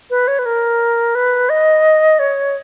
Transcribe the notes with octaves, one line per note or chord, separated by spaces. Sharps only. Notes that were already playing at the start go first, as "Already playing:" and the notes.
B4
C#5
B4
A#4
B4
D#5
C#5